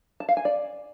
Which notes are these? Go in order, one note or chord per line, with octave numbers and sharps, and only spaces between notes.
A5
F5
G#5
D5